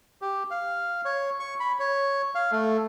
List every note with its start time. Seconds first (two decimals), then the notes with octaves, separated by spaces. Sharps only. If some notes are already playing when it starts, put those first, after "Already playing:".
0.21 G4
0.51 F5
1.05 C#5
1.40 C#6
1.60 B5
1.79 C#5
2.35 F5
2.52 A3